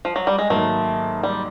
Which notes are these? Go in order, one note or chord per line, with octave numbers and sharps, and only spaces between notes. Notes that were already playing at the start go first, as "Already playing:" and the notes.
F3
F#3
G3
G#3
G#2 D#3 F#3 A3 A#3 D#4
G3